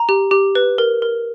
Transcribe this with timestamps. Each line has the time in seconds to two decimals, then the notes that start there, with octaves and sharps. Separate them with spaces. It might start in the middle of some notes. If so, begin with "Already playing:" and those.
Already playing: A#5
0.09 G4
0.31 G4
0.55 B4
0.78 A#4
1.02 A#4